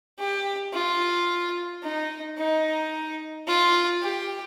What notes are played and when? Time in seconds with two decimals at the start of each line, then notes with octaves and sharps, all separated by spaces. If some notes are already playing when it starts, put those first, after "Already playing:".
0.19 G4
0.73 F4
1.83 D#4
2.38 D#4
3.47 F4
4.02 G4